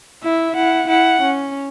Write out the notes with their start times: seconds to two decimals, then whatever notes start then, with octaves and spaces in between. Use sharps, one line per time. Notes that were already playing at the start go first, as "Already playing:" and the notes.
0.23 E4 E5
0.56 E4 F#5
0.88 E4 F#5
1.21 C#4